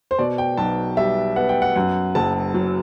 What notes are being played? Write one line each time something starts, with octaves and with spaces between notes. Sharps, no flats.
C5
B2 D5
G5
B1 A5
G3 E5
B3 F#5
G5
F#5
F#2 F#5
F#1 A5
F#3